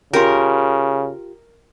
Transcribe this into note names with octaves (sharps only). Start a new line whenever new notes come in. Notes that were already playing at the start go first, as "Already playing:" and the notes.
C#3 F4 G4 A#4